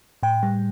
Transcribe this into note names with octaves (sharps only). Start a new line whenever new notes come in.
A2 G5
G3